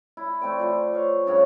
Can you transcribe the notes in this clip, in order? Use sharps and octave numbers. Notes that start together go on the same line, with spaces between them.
E4
A3 C4 D5
F3 B5 C6
C#5 F5
G2 C#3 C#5 F#5